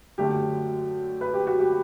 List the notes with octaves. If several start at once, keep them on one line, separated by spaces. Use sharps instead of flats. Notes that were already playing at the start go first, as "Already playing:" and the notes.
F#2 D3 F#3 A3 G4
B4
G4
F#4
G4